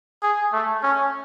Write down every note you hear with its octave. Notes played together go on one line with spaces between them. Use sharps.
G#4
A3
C#4